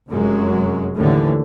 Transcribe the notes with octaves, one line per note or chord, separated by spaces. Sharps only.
F1 F#2 F#3 G#3
D#2 A2 D3 E3